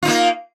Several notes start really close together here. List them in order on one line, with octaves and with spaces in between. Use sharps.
F4 D#4 A#3